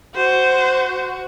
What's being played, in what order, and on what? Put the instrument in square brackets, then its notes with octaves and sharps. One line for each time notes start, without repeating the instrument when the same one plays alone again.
[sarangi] F#4 [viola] C5